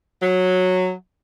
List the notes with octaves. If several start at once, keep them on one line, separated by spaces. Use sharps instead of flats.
F#3